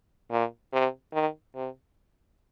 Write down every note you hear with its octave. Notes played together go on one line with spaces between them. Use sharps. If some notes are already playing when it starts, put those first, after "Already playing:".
A#2
C3
D#3
C3